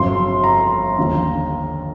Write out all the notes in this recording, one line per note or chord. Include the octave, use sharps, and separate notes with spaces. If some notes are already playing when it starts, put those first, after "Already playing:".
Already playing: G1 F2 C#3 F#3 C6
A#5
D#2 D3 F3